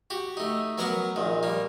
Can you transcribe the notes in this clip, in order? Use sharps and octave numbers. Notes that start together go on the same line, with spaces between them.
F#4 G4
A3 D#4
F#3 B3 A#4 F#5 C#6 D6
A#1 D#3
G3 A#3